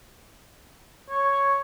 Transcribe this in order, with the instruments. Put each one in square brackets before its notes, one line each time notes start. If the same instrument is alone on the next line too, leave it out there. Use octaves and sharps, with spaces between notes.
[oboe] C#5